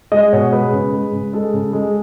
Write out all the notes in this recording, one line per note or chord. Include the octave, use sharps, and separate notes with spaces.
G#3 D#5
B2 C#5
G#3 B4
C#3
G#3
C#3
G#3 A4
C#3
G#3